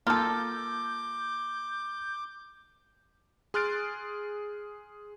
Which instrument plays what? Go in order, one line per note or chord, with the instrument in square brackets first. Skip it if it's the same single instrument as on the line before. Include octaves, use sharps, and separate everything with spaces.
[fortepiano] A#3 [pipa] F4 A4 [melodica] D6 [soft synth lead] G6
[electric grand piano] G#4 C6 F6 F#6 A6 D7